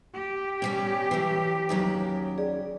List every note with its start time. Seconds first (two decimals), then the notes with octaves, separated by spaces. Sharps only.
0.14 G4
0.62 B2 G3 C#4
1.11 E3 F#3
1.69 D#2 C#3 F#3
2.38 G#4 D5